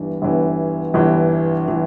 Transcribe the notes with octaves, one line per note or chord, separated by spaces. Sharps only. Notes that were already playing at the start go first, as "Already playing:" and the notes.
Already playing: G1 G2 E3
G1 G2 E3
G1 G2 E3
E3